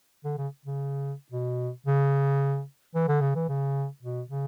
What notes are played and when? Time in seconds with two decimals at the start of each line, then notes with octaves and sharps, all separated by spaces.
0.25 D3
0.38 C#3
0.66 C#3
1.32 B2
1.87 C#3
2.95 E3
3.08 D3
3.21 C#3
3.35 E3
3.49 C#3
4.03 B2
4.30 C#3